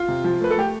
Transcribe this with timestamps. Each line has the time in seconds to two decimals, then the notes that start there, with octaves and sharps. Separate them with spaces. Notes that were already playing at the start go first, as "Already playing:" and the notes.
Already playing: F4
0.08 C3
0.24 F3
0.41 A3 B4
0.51 A4
0.57 A3 G4